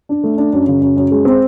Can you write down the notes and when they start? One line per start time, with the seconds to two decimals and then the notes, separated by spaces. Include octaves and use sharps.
0.09 D4
0.24 A3
0.38 D4
0.53 F#2
0.67 C#3
0.81 F#2
0.97 F#2
1.11 G#3
1.25 C4